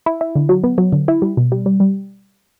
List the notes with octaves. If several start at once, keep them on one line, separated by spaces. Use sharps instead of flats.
E4
E4
D3
F#3
B3
F#3
D3
E4
G3
B2
G3
G3
G3